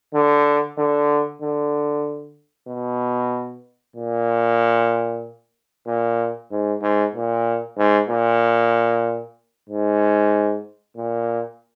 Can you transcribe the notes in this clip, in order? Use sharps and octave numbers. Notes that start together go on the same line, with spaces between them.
D3
D3
D3
B2
A#2
A#2
G#2
G#2
A#2
G#2
A#2
G#2
A#2